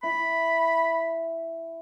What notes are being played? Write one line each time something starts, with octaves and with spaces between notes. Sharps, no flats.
E4 B5